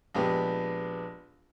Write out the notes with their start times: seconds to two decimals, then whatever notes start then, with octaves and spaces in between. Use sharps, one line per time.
0.15 A#1 G#3 B3 G4